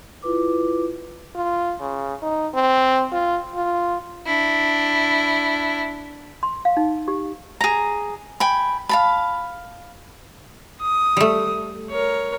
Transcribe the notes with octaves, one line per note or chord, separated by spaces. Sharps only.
E4 F4 B4 D6
F4
C#3
D#4
C4
F4
F4
D4 E4
C6
F5
D#4
G4
G#4 A#5
G5 G#5 B5
F5 A5 B5
D#6
G3 A3
A#4 C#5